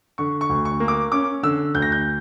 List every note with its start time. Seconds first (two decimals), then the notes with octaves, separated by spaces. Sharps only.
0.18 D3 C#6
0.41 C#6
0.49 D2
0.65 C#6
0.80 A#3
0.88 D6
1.12 C#4 D6
1.43 D3 E6
1.75 D2 G6
1.82 A#6
1.92 G6